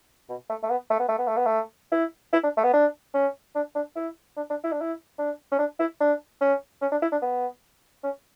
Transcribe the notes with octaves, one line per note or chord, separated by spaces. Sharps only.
B2
A3
A3
B3
A3
B3
A3
B3
A3
B3
A3
E4
E4
D4
A3
B3
D4
C#4
D4
D4
E4
D4
D4
E4
D4
E4
D4
C#4
D4
E4
D4
C#4
C#4
D4
E4
D4
B3
C#4